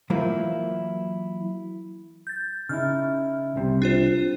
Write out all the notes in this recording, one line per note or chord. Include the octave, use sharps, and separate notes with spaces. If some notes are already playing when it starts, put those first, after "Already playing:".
E3 F#3 A#3 E4 F4 C5
G6 A6
C#3 D#4 E4 F6
C2 C3 G3
D4 F4 C5